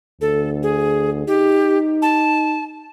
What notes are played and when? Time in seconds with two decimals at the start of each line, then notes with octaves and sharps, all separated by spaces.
0.21 D2 A4
0.63 G#4
1.27 D#4 G4
2.02 A5